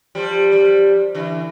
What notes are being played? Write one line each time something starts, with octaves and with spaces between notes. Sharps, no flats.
F3 G3
F3 G3
D3 E3